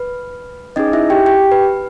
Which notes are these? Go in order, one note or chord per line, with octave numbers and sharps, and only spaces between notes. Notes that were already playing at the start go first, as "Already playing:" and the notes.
Already playing: B4
C#4 D#4 G#4 D#5
E4 E5
G4 G5
G4 G5
B4